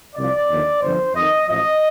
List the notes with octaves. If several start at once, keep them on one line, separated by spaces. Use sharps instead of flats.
C2 C3 F3 D5
D#2 D3 F3
G1 F2 D3 F3 C5
F2 D#3 D#5
A1 A2 F3 D#5